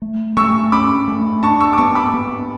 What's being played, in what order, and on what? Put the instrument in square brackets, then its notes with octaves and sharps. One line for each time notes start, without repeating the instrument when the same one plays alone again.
[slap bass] A3
[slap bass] A3 [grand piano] C#6 E6
[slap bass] C#4 [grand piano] B5 D6
[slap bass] A3
[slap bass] D4 [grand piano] A5 C#6
[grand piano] C#6 E6
D6
[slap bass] B3 [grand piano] A5 C#6
[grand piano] B5 D6
[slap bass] B3